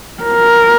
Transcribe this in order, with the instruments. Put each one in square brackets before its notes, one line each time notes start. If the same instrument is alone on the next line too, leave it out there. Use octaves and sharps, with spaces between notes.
[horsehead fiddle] A#4